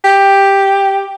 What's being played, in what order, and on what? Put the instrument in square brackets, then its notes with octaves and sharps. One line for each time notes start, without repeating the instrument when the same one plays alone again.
[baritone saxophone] G4